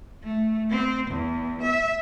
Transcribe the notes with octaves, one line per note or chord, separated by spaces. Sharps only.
A3
C4
E2
E5